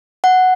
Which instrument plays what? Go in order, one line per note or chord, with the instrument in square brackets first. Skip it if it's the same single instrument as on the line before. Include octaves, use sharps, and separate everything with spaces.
[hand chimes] F#5